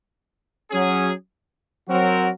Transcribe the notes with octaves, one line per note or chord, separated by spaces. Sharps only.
F#3 C#4 G#4
F#3 C4 F#4 A#4